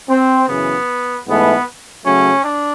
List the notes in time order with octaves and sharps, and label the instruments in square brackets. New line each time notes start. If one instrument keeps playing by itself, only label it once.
[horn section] C4
F#2 C#3 E3 B3
G#2 E3 A3 B3
C#3 F#3 A3 C#4
D4